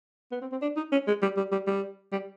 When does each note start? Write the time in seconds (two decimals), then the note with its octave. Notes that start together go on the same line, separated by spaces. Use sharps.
0.32 B3
0.42 C4
0.52 C4
0.62 D4
0.77 D#4
0.92 C#4
1.07 G#3
1.22 G3
1.37 G3
1.52 G3
1.67 G3
2.12 G3